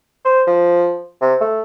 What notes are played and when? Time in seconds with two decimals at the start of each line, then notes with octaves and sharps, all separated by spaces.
0.25 C5
0.47 F3
1.21 C3
1.41 A3